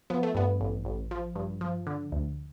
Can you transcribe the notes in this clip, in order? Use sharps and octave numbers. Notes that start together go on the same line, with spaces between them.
F3 B3
A3
G2 B3
A1
A1
F3
G2
F3
D3
D2